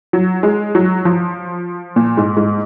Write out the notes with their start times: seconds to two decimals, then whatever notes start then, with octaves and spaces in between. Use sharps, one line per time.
0.13 F#3
0.43 G#3
0.75 F#3
1.05 F3
1.96 A#2
2.17 G#2
2.37 G#2